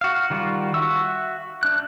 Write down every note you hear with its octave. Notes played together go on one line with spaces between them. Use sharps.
F#4 F5
D#3 G3 F4 F#4
F#4 E5 C#6 E6
D4 F#6